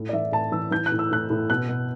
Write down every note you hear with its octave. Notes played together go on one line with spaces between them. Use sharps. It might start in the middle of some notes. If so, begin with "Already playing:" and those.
Already playing: A2
D5
E3 E5
A2 A5
E3 E6
E3 G6
F#6
A2
E6
A2 F#6
A2
B2 F#6
B2